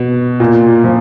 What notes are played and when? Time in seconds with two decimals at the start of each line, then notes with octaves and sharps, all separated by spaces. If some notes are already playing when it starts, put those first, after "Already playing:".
Already playing: B2
0.40 A#2
0.84 F3